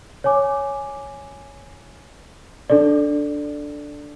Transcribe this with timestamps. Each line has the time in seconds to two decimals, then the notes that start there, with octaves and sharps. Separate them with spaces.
0.24 C#5 G#5 D6
2.70 D4 A4 D5